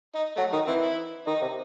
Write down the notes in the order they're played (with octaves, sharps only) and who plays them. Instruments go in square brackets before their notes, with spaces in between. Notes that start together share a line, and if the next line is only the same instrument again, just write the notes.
[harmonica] D#4
[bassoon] F#3 [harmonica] A3
[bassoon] D#3 [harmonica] D#4
[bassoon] E3 [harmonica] C4
[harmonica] E4
[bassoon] D#3 [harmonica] D#4
[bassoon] C3